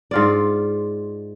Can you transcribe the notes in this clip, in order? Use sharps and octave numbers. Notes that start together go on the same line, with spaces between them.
G#2 F4 D5